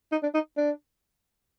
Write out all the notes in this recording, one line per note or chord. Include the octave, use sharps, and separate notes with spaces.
D#4
D4
D#4
D4